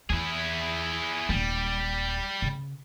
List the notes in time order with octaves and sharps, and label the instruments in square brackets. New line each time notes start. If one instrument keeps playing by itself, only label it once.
[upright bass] E2 [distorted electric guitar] E4 G#4
[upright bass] D#1 A#3 [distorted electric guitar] G3
[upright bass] C#3